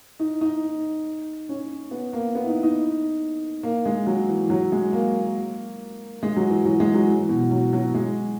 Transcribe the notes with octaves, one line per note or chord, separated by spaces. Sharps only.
D#4
D#4
C#4
B3
A#3
B3
E4
D#4
D#4
A#3
G#3
F#3
E3
F#3
G#3
A#3
G#3
F#3
E3
F#3
G#3
F#3
E3
B2
F#3
F#3
G#3